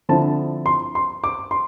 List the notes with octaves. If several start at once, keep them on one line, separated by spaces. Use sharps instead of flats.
D3 F3 C4 E4 A5
C6
C6
D6
C6